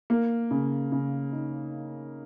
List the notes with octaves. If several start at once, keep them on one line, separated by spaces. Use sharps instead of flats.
A#3
C#3
C#3
D#4